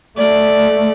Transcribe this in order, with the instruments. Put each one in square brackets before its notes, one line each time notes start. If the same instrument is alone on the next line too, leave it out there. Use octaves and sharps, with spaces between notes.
[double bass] A3 [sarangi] D5